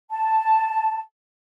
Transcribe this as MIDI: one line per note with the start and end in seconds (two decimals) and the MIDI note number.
0.10 0.98 81